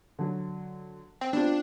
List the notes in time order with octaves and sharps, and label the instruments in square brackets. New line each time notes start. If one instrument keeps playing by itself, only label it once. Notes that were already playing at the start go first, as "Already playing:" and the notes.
[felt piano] D3 F#3
[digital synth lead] C4
[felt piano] B3 C4 F4 [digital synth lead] D4